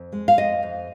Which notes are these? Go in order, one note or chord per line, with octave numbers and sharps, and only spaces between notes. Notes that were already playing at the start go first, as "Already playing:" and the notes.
Already playing: F2
G#3
F5
F2 D#5
F2